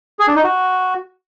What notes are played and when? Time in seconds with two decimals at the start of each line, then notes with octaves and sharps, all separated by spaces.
0.19 G#4
0.27 D4
0.36 D#4
0.44 F#4